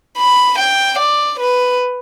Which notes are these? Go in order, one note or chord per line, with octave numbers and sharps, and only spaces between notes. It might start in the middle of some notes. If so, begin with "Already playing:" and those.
B5
G5
D5
B4